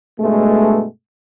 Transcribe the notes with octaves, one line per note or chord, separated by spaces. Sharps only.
G2 B2 G#3 A3